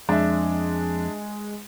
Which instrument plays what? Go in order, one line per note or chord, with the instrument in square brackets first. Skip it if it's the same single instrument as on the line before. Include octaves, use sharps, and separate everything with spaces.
[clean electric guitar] F2 [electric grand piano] G#3 [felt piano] D4 E5